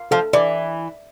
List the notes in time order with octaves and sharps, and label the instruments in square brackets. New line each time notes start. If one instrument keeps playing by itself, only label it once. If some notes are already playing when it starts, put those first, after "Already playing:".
Already playing: [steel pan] F5
[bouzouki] F3 [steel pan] A4
[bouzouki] E3 [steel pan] D5